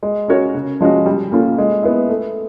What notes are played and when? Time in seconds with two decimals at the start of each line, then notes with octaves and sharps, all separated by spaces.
0.03 G#3
0.28 C#4 F#4 A#4 C#5
0.54 C#3
0.81 F3 G#3 C#4 F#4
1.06 G3
1.32 A#3 C#4 F4 A4
1.58 G#3
1.83 B3 E4
2.09 A3